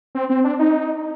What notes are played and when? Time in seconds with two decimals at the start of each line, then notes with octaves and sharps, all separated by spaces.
0.15 C4
0.30 C4
0.44 D4
0.59 D#4